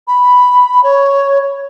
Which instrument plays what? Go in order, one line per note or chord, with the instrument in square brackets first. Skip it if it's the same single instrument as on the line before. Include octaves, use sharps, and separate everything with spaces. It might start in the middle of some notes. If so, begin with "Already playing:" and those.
[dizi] B5
C#5